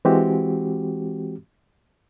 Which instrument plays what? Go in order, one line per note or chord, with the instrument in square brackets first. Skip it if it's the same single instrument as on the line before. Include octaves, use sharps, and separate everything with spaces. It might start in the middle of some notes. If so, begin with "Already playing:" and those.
[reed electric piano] E3 G#3 C4 F#4 G4